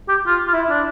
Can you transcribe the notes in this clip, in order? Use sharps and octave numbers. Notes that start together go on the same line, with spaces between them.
G4
F4
F4
E4
D4